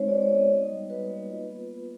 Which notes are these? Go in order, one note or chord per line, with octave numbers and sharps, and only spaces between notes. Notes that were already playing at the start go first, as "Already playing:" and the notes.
Already playing: G#3 C4 D#4 C5 C#5
F#4 D5
C#5
B3
D#5
D#4 D#5
G3
F#4 B4
A#3
F4
B3
B3